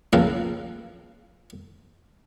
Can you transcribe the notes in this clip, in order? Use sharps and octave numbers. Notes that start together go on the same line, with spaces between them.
C#3 F3 A#3 C4 B4 F5